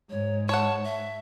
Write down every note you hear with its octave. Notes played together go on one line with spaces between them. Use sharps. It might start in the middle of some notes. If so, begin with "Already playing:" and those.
G#2 C#5
C#5 F#5 A5
E5